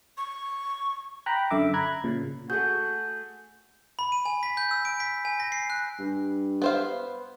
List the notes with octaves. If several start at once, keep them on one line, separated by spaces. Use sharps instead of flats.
C#6
G5 A#5 B5 F#6
F#2 D3 E5 D6
A#5 B5 F#6 G#6
A#2 C#3
A3 F#4 G#4 G6
B5
D#7
G#5
B6
G6
E6
D7
B6
G#5
A#6
C7
F#6
G2
B3 C5 F5